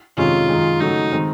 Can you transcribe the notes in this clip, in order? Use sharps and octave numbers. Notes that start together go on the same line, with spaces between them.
F2 C3 D#3 G#3 C#4 F4
F#2 D#3 G#3
C#3 F#3 A3 D#4
D#3 G#3 C4